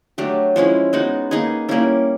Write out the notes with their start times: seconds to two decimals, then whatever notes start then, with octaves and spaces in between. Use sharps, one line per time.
0.18 F#3 A3 D4 G4
0.56 F3 G#3 C#4 E4
0.93 G#3 B3 D#4 F#4
1.31 A#3 D#4 G#4 B4
1.69 G3 A#3 C#4 E4